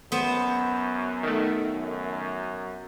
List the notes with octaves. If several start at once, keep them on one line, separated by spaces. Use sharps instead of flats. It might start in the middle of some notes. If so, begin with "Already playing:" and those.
F#2 B3 C5
D#3 A3
F#2